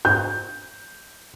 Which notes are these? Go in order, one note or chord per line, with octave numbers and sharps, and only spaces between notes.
G6